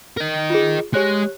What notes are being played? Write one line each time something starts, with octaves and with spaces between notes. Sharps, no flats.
A#4 D#5
F4 G#4
G#3 G4 C#5 F#6